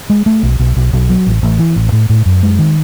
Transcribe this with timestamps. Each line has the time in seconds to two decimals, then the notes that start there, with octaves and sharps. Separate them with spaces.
0.10 G#3
0.26 A3
0.43 B1
0.59 B1
0.76 B1
0.93 B1
1.10 F#3
1.27 A1
1.43 A1
1.59 E3
1.76 A1
1.92 A2
2.10 A2
2.26 F#2
2.43 G#3
2.59 D#3